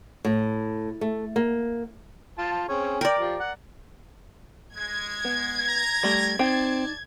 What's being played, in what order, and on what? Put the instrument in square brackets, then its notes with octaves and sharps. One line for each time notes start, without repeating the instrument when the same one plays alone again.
[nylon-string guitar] A2
A3
A#3
[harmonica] F4 A5
C4 C#4 G#4
[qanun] A#4 D5 [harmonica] G5
[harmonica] F3 G4
F#5
[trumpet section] G#3 [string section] G#6
[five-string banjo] B3
[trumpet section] A#5
[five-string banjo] G3 A3 G4
[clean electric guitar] C4 [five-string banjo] D#4 G5 [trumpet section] D5 A5